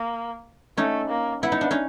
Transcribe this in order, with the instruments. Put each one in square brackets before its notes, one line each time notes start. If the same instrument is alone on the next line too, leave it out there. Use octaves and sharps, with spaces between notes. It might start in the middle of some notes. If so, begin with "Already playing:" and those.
Already playing: [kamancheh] A#3
[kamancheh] A3 [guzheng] C#4 D#4
[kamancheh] A#3
[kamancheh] B3 [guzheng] E4
[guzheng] D#4
D4
C#4 D#4